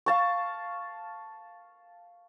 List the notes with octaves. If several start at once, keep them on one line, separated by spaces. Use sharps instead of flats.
F5 A5 C#6